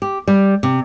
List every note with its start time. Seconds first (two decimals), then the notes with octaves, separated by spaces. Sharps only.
0.02 G4
0.28 G3
0.63 C3